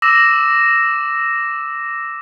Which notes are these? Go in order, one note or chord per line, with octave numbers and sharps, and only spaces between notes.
D6 E6 A#6 E7